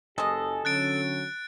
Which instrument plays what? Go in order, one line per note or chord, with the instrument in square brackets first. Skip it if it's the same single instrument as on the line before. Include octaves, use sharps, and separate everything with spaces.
[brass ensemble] F#1 G4 G#5 [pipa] G#3 D#5 [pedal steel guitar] A4
[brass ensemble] D3 F#3 C#4 [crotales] F#6 A6 D7